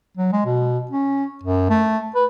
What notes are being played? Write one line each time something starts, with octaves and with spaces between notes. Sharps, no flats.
F#3
G#3
B2
C#4
F#2
A3
B4